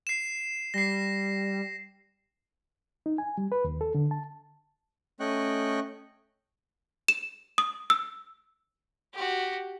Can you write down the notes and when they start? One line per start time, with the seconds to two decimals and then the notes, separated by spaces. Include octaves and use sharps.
0.07 C7 E7
0.74 G3 A#6 C7
3.06 D#4
3.18 G#5
3.38 G3
3.52 B4
3.64 D#2
3.81 A4
3.95 D3
4.11 A5
5.20 A3 C#4 D#5 G5 C#6 F#6
7.08 E7
7.58 D#6
7.90 E6
9.14 F#4 G4